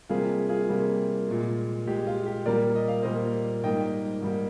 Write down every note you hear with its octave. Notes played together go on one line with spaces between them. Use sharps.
C3 G3 A#3 F4 G#4
F4 G#4
C3 G3 A#3 F4
A#2 G#3
A#2 G#3 G4
F4
G4
A#2 G3 A#3 A#4 D5
D#5
F5
A#2 G3 A#3 C5 D#5
G#2 G3 A#3 D#5 G5
G#2 G3 A#3